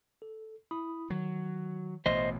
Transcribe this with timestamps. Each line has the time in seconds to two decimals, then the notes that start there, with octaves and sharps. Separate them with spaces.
0.22 A4
0.71 E4 B5 D#6
1.10 D#3 F#3
2.06 A1 B2 C5 D#5 E5 C6